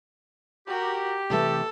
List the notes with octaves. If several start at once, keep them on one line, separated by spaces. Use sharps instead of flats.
F#4 G4 A#4
C3 E3 A3 A4